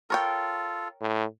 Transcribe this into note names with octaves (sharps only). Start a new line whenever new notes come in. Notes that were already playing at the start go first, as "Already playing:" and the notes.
F4 A4 A#4 C#5 G5
A2